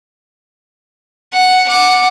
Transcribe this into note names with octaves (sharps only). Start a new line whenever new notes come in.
F#5
F#5 D6